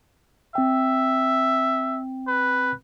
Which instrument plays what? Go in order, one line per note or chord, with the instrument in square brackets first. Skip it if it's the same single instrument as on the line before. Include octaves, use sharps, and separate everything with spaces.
[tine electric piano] C4 G5 [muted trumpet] E5
[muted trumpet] B4